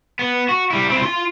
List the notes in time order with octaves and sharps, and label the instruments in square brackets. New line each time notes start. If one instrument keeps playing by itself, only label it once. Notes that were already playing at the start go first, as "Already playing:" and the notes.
[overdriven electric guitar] B3
F#4
G3 E4
C4 E4
F4 C6